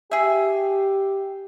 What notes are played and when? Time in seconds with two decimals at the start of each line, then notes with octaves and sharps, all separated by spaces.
0.11 G4 G#4 E5